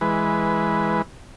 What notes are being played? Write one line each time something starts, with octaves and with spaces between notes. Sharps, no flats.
E3 G#3 B4